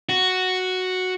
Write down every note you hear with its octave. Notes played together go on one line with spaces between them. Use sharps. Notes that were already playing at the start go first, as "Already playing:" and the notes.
F#4